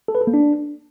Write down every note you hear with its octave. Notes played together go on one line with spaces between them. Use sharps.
A4
B4
A4
A#3
D4